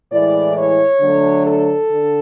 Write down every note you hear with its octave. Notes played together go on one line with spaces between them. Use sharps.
A2 E3 G#3 D5
C#5
D3 F#3 A3
A4
D3